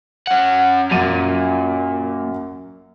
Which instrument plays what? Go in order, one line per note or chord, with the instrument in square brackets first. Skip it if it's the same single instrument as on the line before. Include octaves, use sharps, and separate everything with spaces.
[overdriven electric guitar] C#4 F#5
[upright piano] F#2 D#7 [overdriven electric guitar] A#2